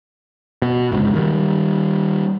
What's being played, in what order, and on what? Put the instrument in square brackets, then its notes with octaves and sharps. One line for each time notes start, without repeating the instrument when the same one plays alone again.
[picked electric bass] B2
G1 C#2 G#2
D#3 G3